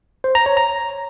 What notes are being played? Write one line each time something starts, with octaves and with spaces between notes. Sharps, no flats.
C5
A#5
C#5
A#5